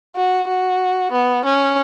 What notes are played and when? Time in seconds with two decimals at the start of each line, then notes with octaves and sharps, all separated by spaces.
0.16 F#4
0.48 F#4
1.12 B3
1.45 C#4